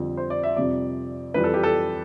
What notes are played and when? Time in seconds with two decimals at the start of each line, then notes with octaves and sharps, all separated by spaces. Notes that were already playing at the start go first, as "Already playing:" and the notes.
Already playing: F2 D3 G3
0.17 C5
0.30 D5
0.43 E5
0.56 F2 C3 G3 D5
1.34 F2 E3 G3 B4
1.44 A4
1.54 G4
1.63 A4